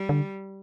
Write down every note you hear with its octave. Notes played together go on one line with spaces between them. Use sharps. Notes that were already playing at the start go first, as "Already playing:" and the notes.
Already playing: G3
D3